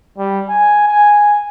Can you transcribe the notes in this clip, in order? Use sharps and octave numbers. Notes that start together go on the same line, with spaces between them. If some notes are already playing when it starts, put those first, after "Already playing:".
G3
G#5
G#5